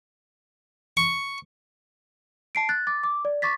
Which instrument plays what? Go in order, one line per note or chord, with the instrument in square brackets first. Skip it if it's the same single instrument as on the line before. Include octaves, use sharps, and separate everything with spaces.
[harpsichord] C#6
[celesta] A5 C7 D7
F#6 A6
D6 A6
D6
D5
C#6 D6 A6 B6